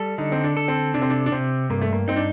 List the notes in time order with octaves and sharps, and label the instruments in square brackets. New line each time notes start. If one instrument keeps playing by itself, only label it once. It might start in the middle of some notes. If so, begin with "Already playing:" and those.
Already playing: [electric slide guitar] G3 A4
[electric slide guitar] D3 [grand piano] D#4
[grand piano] C4
D4
[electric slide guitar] A4
[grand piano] C4
[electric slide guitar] C3 [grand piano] D4
[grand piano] C4
D4
D4
[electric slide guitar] C3 [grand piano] C4
[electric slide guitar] G2 [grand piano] A#3
[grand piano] A3
A#3
[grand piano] C4 [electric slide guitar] D#4
[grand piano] D4